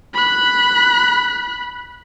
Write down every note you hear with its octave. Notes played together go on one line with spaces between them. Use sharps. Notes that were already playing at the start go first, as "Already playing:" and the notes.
B5 F#6